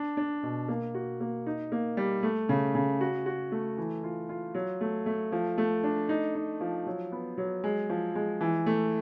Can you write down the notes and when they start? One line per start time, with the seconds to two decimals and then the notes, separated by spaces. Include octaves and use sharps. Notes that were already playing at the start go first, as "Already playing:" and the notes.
Already playing: D4
0.17 D4
0.43 B2
0.68 A#3
0.94 F#4
1.20 A#3
1.46 D#4
1.72 A#3
1.97 G3
2.23 A3
2.49 C#3
2.75 C#3
3.01 F#4
3.26 F#4
3.52 A3
3.78 E3
4.04 F4
4.29 F4
4.55 F#3
4.81 A3
5.06 A3
5.32 F3
5.58 A3
5.84 D4
6.09 D#4
6.35 D#4
6.61 F3
6.86 F#3
7.12 B3
7.38 F#3
7.64 G#3
7.89 F3
8.15 G#3
8.41 E3
8.66 A3